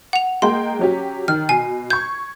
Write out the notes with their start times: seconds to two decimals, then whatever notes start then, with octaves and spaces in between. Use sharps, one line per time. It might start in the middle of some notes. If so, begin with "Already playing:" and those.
0.13 F#5 F7
0.42 G#3 A#3 G5 C6
0.79 F#3 C#4 G4
1.28 D#3 F6
1.49 B2 G#5 C7
1.90 C#6 G6 G#6